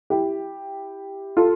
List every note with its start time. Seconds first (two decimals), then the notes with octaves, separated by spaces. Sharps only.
0.10 E4 G4
1.37 F4 A4